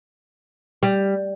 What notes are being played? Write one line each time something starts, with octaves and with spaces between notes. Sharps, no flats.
G3